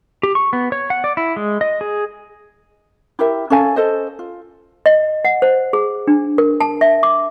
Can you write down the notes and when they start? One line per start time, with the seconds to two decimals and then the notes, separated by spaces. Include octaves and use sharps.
0.23 G4
0.35 C#6
0.53 B3
0.72 C#5
0.90 F#5
1.04 D5
1.17 E4
1.36 G#3
1.61 D#5
1.81 G#4
3.19 E4 G4 A#4 E5
3.50 C#4 A4 F5 G#5
3.76 A4 C5 D#5
4.19 F4
4.86 D#5
5.25 F#5
5.42 C5
5.73 G#4
6.08 D4
6.38 A#4
6.60 A5
6.81 E5
7.03 D6